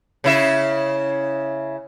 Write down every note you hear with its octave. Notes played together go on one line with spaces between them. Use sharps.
C#3 E4 E5